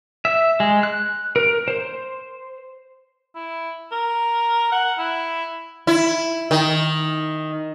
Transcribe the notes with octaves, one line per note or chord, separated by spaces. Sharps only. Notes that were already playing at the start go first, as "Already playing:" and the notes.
E5
G#3
F#6
A#4
C5
E4
A#4
F#5
E4
E4
D#3